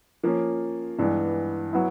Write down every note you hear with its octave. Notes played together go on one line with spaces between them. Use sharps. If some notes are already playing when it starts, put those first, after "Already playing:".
F3 A#3 C#4
G2 E3 G#3 B3
F#3 B3 E4